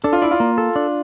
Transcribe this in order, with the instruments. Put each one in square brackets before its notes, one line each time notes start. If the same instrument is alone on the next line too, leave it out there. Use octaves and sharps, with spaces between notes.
[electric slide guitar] D4 [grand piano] A4
[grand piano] F4
[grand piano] E4 [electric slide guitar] D5
[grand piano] F4
[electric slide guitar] A#3
A4
D4